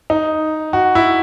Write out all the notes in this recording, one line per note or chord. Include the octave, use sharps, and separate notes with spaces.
D#4
F#4
E4